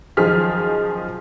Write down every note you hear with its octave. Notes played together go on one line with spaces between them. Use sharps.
F#2 D#3 F3 G#4 F6 B6